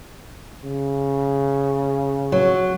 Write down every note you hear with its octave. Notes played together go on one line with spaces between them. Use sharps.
C#3
F#3